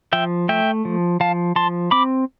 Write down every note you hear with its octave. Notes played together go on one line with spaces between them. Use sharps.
F3 E5 G5
A3 E5 G5
F3
F3 F5 A5
F3 A5 C6
C4 B5 D6